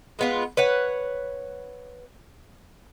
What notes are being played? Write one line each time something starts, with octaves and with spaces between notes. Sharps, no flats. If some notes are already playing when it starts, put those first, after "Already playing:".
G#3 B3 F4
B4 C#5 F#5